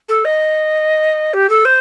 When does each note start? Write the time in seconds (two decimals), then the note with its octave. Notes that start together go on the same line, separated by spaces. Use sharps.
0.08 A4
0.24 D#5
1.33 G4
1.49 A4
1.65 C5